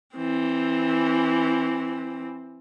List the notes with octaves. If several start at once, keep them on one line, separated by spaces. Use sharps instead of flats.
E3 C4